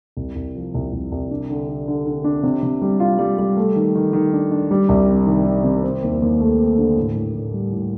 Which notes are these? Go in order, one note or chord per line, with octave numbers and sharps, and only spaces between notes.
C2
C2
F3
C2
C2
C2
D4
D3
D3
D3
D3
D4
C3
C3
G3
F4
G3
G3
A3
D#3
D#3
D#3
D4
D4
G3
C2
C3
D#3
D#3
C3
C4
D#2
D#2
A3
C4
D3
A2
A2
A2
G3
A2